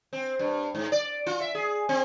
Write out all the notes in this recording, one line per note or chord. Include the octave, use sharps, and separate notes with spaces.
C4
G2
G#2
D5
F4
E5
G#4
C4